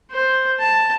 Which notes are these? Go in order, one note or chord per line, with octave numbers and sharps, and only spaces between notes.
C5
A5